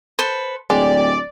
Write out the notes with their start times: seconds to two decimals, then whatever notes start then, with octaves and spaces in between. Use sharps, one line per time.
0.19 A4 B4 C5
0.70 D1 G#3 G4 D5